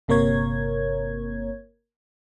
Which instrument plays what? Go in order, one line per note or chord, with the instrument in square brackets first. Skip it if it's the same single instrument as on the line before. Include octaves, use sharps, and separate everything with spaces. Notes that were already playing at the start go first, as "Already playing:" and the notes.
[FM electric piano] G1 C3 A#3 A#4 C#5 G#6